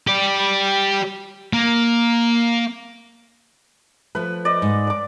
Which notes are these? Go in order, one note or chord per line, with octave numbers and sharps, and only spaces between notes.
G4 D5
A#3
F3 A3 B4
D5 D#5
G#2
D5 D6